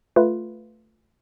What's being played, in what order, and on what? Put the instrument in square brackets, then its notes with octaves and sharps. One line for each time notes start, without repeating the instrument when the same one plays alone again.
[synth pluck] A3 F4 B4